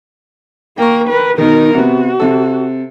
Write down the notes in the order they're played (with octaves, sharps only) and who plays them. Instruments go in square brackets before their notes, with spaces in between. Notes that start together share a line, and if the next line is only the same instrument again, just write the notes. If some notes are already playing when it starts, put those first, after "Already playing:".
[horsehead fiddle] A#3 A#4 [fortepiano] G5 C#6
[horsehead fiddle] A#4 B4
[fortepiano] B2 D#3 [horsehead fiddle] D#4 A#4
[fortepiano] C3 B3 [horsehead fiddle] F#4
[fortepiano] C3 A4